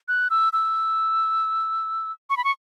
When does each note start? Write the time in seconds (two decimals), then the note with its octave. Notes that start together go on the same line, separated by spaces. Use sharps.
0.08 F#6
0.30 E6
0.53 E6
2.30 C#6
2.37 B5
2.44 C#6